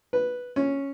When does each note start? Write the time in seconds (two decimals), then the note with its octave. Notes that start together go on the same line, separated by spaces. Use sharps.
0.13 B4
0.56 C#4